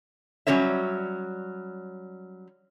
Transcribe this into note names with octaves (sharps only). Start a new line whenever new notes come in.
F#3 G3 C#4 A#4 C#5 E5